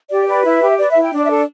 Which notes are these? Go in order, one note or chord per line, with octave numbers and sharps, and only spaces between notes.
G4 D5
B4 D5
E4 E5
G4
B4 D5
E5
E4
G5
D4 D5
E5
A4